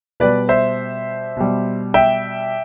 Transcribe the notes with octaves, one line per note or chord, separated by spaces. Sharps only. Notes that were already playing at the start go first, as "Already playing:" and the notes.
B2 G3 B4 D5
C5 E5
B2 G3
E5 G5